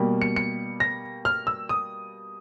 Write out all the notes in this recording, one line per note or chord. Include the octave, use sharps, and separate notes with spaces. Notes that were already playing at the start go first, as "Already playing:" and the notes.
Already playing: B2 G3 A#3
C#7
C#7
A#6
F6
E6
D#6